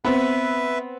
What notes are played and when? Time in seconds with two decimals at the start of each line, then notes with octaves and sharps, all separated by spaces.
0.05 B3 C4 B4 E5